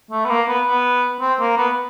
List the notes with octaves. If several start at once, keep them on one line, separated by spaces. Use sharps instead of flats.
A3
B3
A#3
B3
B3
C4
A#3
B3